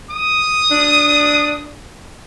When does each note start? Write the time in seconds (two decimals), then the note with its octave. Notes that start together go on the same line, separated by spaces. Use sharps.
0.10 D#6
0.71 D4